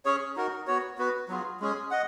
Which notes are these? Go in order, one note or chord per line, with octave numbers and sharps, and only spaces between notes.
C#4 G#4 C#5
D#4 F#4 A#4
B3 F#4 C#5
B3 F#4 B4
F#3 B3 F4 G#4
G#3 C#4 G#4
D#5 F#5